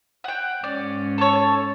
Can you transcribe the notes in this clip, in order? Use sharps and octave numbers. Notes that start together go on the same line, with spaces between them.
F#5 G5
G#2 C#4 D5
A4 C#5 A5